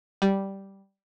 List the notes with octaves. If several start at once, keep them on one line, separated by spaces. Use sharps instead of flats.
G3